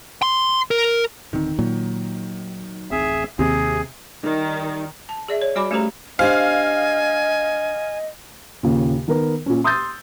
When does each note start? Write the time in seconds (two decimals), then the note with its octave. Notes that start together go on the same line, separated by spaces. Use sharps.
0.22 C6
0.71 A#4
1.33 D1 D3 D#3 C4
1.59 A#2 F#3
2.91 D1 A1 C4 G#4 E5
3.39 D#2 C3 C4 G#4
4.23 D#3 G3 D#4
5.09 A5
5.28 G#4 D5 E5
5.42 C#5
5.56 G3 F#4 D5 G#5 B5 D6
5.71 A3 C#4 G4 A4 C5 A#5
6.19 D4 G4 C5 D#5 F5 G#5
8.63 D#2 A#2 C#3
9.08 D#3 B3 A#4
9.46 A#2 C#4
9.64 C6 D#6 E6 G6 A6